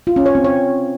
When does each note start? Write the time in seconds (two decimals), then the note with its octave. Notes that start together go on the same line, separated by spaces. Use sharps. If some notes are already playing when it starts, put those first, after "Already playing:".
0.07 F4
0.16 C#4
0.26 C#5
0.35 C4
0.44 C#5